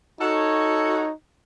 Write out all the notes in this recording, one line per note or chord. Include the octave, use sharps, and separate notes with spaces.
D#4 F#4 A4 C#5